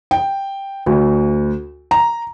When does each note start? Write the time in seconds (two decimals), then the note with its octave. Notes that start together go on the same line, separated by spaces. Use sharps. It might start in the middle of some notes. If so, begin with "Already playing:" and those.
0.11 G5
0.86 D2
1.91 A#5